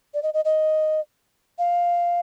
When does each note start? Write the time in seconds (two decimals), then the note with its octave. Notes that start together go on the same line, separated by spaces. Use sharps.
0.14 D5
0.23 D#5
0.34 D#5
0.45 D#5
1.59 F5